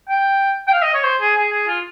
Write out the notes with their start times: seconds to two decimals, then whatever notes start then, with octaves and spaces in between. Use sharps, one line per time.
0.09 G5
0.68 G5
0.73 F5
0.83 D#5
0.94 C#5
1.04 C5
1.21 G#4
1.37 G#4
1.52 G#4
1.67 F4